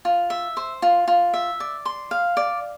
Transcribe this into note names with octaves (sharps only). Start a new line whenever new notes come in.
F4
E5
C5
F4
F4
E5
D5
C6
F5
D5